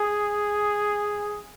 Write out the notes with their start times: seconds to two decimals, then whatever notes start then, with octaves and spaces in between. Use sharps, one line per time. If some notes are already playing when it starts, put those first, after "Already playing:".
Already playing: G#4